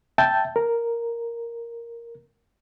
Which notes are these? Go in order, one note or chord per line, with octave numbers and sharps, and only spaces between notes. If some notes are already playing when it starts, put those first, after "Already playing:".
E5 G5 A5 G6
A#4